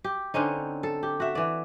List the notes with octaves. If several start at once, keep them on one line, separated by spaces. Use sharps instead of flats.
G4
D3 C4 C#4 D#4
A4
G4
F#4 E5
E3 D5